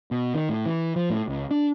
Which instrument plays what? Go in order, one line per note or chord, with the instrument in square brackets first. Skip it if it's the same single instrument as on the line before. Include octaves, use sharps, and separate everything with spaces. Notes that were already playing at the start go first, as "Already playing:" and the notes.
[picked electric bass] B2
D#3
A2
E3
F3
A2
C#2
D4